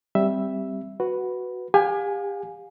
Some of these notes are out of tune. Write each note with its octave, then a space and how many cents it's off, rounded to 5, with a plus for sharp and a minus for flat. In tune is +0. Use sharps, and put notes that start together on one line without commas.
G3 +0 C4 +0 E5 +0
F#4 +0 B4 +0
G4 +35 F5 +35 G#5 +0